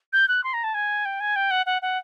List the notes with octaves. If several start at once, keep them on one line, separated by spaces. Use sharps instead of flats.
G6
F#6
C6
A#5
A5
G#5
G5
G#5
G5
F#5
F#5
F#5